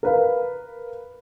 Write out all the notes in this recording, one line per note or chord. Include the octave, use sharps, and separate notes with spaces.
A#4 B4 F5